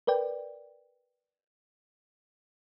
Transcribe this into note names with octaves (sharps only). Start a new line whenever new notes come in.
A#4 B4 D5 G5